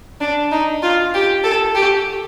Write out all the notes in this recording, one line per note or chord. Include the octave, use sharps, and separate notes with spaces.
D4
D#4
F4
G4
A4
G4